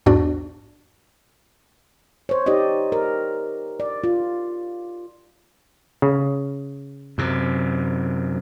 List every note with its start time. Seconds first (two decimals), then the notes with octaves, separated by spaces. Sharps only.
0.06 A#1 E2 G#2 D4 F#4 D5
2.29 C5 C#5
2.46 D#4 G4 C5 D5 D#5
2.92 A#4
3.80 D5
4.04 F4
6.02 C#3
7.18 F#2 C3